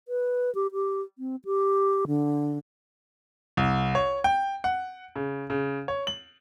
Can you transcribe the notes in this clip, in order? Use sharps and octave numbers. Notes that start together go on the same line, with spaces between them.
B4
G4
G4
C4
G4
D3
C2
C#5
G5
F#5
C#3
C#3
C#5
F#7